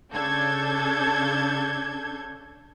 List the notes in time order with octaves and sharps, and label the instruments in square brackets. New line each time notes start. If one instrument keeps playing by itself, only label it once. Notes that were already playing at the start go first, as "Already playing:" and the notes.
[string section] C#3 D4 A4 G6 G#6